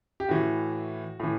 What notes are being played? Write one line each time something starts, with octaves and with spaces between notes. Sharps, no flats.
G4
A2 E3 F#4
A2 E3